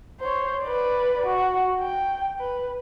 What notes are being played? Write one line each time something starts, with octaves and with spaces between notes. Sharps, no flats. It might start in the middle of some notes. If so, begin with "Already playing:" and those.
C5 C#5
B4 D5
F#4
G5
B4